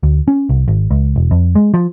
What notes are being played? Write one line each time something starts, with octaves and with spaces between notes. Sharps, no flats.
D2
C#4
C2
G#1
C#2
E1
F2
G#3
F3